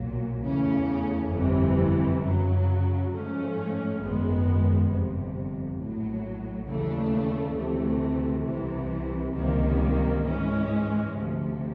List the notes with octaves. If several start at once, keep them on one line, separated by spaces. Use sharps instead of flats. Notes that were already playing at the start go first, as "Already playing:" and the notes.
Already playing: B1 A#2 F#3
E2 C#3 E3 A3 C#4
G1 F2 C3 E3
F#2 C#3 F#3
G#2 F3 A3 C#4
G#1 F#2 D#3 G#3 B3
G1 F2 C3
A#1 A2 F#3
D#2 C#3 E3 A3 D4
D2 C3 E3 A3
C2 C3 E3
C#2 C3 D#3 G3 A#3
G#2 E3 G#3 C#4
D2 C3 F3